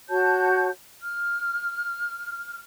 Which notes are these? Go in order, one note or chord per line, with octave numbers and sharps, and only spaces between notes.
F#4 C#5 A5 G6
F6